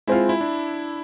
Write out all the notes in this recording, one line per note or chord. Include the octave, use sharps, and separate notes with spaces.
G#3 C4 E4 F4
E4
D4